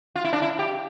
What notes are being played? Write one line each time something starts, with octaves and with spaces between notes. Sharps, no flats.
F4
E4
D4
E4
G4